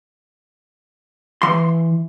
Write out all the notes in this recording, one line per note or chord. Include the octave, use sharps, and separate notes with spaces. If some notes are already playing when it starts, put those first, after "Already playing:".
E3 C6